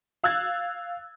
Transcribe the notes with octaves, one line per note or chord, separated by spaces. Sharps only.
F5 E6 F#6 G#6 A6